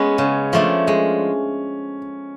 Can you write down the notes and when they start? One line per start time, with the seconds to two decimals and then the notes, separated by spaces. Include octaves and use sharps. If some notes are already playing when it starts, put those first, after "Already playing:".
Already playing: G#3 B3 C#4
0.18 C#3
0.53 F3 A3 D4
0.87 G#3